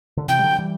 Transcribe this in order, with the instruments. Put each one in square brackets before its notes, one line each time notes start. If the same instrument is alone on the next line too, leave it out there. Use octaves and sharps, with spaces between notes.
[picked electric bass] D3
[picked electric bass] C3 E3 [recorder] G5
[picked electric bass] G3
D3 F#3
E3 G3